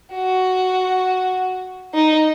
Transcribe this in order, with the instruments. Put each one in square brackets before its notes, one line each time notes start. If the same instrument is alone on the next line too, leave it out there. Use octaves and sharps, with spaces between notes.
[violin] F#4
D#4